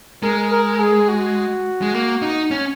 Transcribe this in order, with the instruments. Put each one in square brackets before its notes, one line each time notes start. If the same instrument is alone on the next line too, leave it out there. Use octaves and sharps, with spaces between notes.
[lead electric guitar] G#3 [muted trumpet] A#4
[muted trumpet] A#4
G#4
F#4
[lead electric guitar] G#3
A#3
D#4
C#4